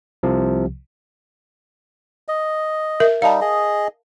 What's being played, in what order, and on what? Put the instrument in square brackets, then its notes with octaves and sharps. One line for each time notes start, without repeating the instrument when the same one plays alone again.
[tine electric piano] C2 C3 F3
[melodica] D#5
[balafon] A#4 E5
[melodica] G3 D#4 [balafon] F5 A5
[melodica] G#4 D#5